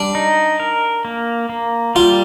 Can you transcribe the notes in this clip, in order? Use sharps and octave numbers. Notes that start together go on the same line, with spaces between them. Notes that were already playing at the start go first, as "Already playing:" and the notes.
Already playing: G3 D4
D#4
A#4
A#3
A#3
G3 F4